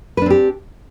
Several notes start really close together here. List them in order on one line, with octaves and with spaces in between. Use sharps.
B4 D4 C4 G4